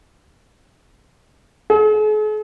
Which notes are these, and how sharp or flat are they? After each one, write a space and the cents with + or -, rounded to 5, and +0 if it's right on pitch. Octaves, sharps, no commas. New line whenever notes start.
G#4 +45